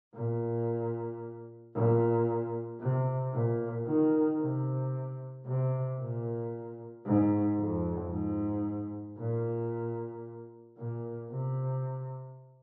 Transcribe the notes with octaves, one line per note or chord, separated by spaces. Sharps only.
A#2
A#2
C3
A#2
D#3
C3
C3
A#2
G#2
F2
G#2
A#2
A#2
C3